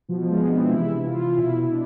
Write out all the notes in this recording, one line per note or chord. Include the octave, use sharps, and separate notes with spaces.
B2 F3
F3
G#3
B3
D4
C4
E4
C3 E3 E4
E4
F4
F4
B2 E4
D4